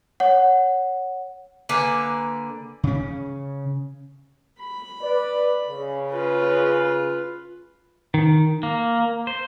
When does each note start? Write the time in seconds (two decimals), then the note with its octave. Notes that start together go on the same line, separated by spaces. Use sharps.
0.20 C#5 F#5
1.69 D3 A#3 B4 G#5
2.83 C#3 C#4
4.60 B5
5.03 B4 D5
5.69 C#3
6.11 F4 B4
8.14 D#3
8.63 A#3
9.27 C5